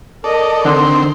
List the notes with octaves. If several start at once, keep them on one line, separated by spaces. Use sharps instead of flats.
A4 A#4 D5 D#5
D3 D#3 C4 C6